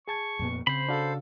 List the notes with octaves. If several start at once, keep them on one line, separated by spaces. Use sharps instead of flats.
G#4 A5 C#6 G#6
F2 A#2 B3
C#3 C4 C5 B5
D4 F#4 A4 F5